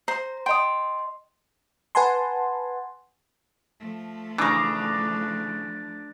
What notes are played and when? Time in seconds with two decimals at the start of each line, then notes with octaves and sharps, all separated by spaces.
0.08 C5 A#5
0.46 D#5 G5 C6 D#6
1.95 B4 F#5 G#5 A5 C6
3.80 F3 A3
4.38 C#3 E3 D4 A#5